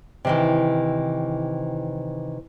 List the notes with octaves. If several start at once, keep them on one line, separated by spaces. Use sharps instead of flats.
C3 D#3 E3